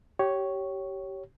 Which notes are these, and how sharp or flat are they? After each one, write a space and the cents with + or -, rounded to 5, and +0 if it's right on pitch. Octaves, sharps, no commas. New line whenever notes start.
G4 -20 C#5 +0